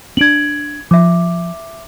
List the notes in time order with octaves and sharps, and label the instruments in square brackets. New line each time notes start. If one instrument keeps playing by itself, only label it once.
[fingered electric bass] C4 D4 [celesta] G#6 D7 F#7
[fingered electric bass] F3 [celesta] E5 D6